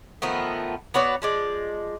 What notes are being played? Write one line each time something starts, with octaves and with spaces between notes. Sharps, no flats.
D#3 F3 A3 B3
B3 F#4 C#5 D5
F3 G#3 D5